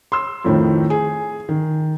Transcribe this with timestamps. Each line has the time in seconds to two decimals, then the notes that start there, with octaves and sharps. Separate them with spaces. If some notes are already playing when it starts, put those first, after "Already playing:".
0.12 C6 E6
0.45 F2 A2 D#3
0.90 G#4
1.49 D#3